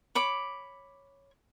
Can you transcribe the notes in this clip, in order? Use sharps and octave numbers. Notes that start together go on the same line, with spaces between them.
C#5 B5 D6